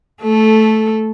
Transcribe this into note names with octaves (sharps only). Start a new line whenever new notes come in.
A3 A4